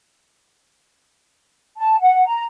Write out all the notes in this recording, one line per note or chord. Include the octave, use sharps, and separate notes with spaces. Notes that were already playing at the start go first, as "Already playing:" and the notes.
A5
F#5
A#5